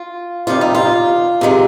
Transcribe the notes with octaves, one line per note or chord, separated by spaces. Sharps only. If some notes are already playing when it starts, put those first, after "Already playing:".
Already playing: F4
C3 D#3 G3 F4
D#4
F4
C3 D#3 G#3